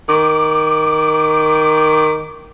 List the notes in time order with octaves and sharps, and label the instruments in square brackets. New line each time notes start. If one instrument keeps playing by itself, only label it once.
[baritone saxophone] D#3 [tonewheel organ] D6